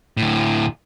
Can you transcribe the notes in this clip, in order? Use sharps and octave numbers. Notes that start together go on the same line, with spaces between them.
D2 A2